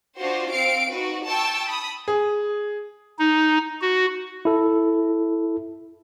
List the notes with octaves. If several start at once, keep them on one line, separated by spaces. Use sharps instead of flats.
D4 F4 F#4 C5
C4 F5 C7 D7
D#4 F#4 B4
G5 A5 C#6 E6
B5 D#6
G#4
D#4
F#4
E4 A4